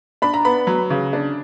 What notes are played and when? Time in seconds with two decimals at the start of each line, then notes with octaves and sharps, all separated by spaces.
0.22 D4 B5
0.34 A#5
0.45 B3 B5
0.67 F#3
0.90 C#3
1.13 D4